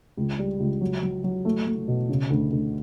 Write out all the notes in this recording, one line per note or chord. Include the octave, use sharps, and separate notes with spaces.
C#2
G3
C#2
F#3
F#3
F#3
A3
A3
B2
C#3
D2
D2